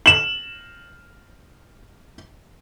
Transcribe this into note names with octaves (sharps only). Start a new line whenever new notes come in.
E7 F#7